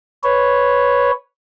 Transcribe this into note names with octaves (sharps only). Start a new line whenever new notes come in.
B4 C#5